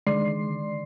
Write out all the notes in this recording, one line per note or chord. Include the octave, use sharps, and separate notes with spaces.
D3 D#3 G#3 D5 C6 C7